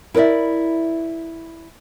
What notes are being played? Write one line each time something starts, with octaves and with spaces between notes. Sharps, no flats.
E4 A#4 B4 D5 E5